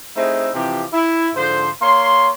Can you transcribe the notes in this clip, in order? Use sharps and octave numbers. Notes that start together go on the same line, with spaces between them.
A3 C4 D#4 E4 G#4
C3 E3 F3 G4
E4
G#2 D3 F3 C5
A#3 C#5 C6